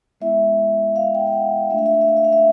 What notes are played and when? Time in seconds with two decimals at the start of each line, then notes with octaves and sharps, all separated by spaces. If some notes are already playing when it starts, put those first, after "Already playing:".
0.21 G#3 B3 E4 E5
0.96 F5
1.15 G5
1.27 F5
1.32 F#5
1.70 A3 D4 F4 E5
1.78 F5
1.86 E5
1.94 F5
2.01 E5
2.08 F5
2.17 E5
2.24 F5
2.32 E5